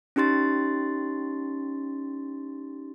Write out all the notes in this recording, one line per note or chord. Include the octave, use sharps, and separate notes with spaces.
C#4 D#4 G4 C6 A6